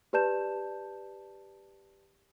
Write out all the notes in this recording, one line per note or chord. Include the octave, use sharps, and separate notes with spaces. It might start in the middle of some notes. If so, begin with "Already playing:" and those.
G4 B4 D5 A5 G6 E7